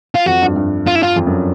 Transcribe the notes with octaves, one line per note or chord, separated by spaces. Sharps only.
F4
F2 F#4
G2
G2
F4
E4
F4
F2
F#2